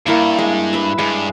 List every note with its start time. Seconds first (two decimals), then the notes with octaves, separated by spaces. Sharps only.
0.06 G2 A#3 E4 C#6
0.38 G#3
0.73 B4 E5
0.99 G2 G#3